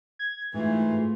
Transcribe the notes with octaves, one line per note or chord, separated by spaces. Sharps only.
G#6
G#2 E3 A3 F4